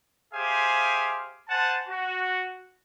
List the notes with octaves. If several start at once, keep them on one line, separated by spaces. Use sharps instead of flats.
G4 G#4 C5 E5 F5 G#5
C5 F#5 G#5 A5
F#4